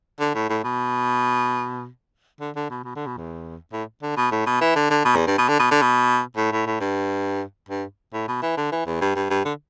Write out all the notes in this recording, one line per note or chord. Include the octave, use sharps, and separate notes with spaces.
D3
A2
A2
B2
D3
D3
B2
B2
D3
B2
E2
A2
D3
B2
A2
B2
E3
D3
D3
B2
E2
G2
B2
D3
B2
D3
B2
A2
A2
A2
G2
G2
A2
B2
E3
D3
E3
E2
G2
G2
G2
D3